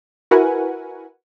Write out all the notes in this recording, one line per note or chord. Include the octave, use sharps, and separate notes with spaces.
E4 F#4 A#4 B4 F#5 G#5